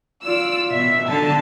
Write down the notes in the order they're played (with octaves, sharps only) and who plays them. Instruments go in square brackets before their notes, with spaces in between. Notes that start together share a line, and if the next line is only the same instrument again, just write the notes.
[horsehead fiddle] F4 D5 [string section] E6
[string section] B2 [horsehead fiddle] E5
[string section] D3 [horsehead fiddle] A5